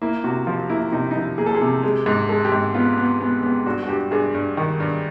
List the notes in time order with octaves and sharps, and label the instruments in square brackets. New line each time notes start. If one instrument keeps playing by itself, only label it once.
[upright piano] A#3 E4
C3 F#4
F3 F4
A#3 E4
C3 D#4
D#4
F3 E4
A#3 G#4
A4
G#4
C3
G#3
G#2
G#3 A4
G4
G#2
B3 F4
B3
B3
B3
G2 F#4
F#4
G2 G4
G2 G#4
G2
D#3
G2